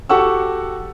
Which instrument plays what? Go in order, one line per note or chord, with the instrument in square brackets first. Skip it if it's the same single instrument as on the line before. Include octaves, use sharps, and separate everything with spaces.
[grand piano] F#4 G4 A4 F#5 C#6 E6